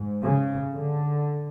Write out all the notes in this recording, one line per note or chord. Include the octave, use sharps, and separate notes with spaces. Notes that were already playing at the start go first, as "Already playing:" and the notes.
Already playing: G#2
C#3
D3